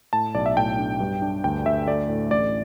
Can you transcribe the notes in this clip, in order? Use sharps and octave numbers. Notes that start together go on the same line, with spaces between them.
A2 A5
B1 D5
E5
A2 G5
D4
G2
D4
D2 G5
D2 E5
A3 D5
A2
A1 D5